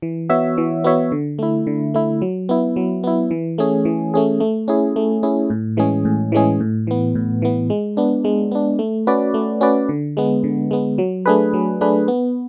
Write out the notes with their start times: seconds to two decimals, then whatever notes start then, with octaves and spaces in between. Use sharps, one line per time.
0.02 E3
0.29 B3 F#4 C#5 E5
0.58 E3
0.84 B3 F#4 C#5 E5
1.12 D3
1.39 A3 E4
1.67 D3
1.94 A3 E4
2.22 F#3
2.49 B3 E4
2.76 F#3
3.04 B3 E4
3.31 E3
3.58 A3 C#4 G#4
3.85 E3
4.14 A3 C#4 G#4
4.40 A3
4.68 C#4 E4 G#4
4.96 A3
5.23 C#4 E4 G#4
5.50 A2
5.77 E3 G#3 C#4 G#4
6.05 A2
6.32 E3 G#3 C#4 G#4
6.60 A2
6.87 E3 B3
7.15 A2
7.42 E3 B3
7.70 G#3
7.97 B3 D4
8.24 G#3
8.52 B3 D4
8.79 A3
9.07 C#4 F#4 B4 D5
9.34 A3
9.61 C#4 F#4 B4 D5
9.89 D3
10.17 G#3 B3
10.44 D3
10.71 G#3 B3
10.98 F#3
11.26 A3 D4 G#4 B4
11.54 F#3
11.81 A3 D4 G#4 B4
12.08 B3